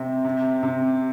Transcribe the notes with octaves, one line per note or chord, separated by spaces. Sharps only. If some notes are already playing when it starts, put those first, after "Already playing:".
Already playing: C3 C4
C3
C3